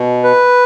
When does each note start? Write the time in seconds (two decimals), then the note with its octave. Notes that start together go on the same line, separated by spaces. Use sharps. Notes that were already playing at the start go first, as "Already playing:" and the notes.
Already playing: B2
0.24 B4